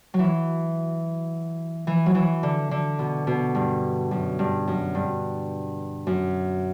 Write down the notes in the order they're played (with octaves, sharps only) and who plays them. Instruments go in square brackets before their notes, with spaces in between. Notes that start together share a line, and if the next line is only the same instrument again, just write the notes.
[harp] F#3
E3
E3
F#3
E3
D3
D3
B2
B2
G2
F#2
G2
F#2
G2
F#2